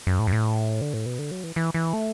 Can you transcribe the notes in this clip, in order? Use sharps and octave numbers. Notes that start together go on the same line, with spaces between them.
F#2
A2
F#2
A2
D3
A2
B2
D3
F#3
E3
E3
E3
A3